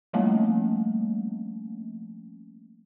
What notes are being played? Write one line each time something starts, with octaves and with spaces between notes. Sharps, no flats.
F3 G3 A3 A#3 C4 C#4